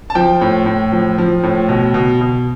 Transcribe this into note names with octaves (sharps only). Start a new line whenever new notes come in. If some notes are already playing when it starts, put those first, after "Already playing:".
A5
F3 G5
A2
A2
F3
F3
A2
B2
B2
B2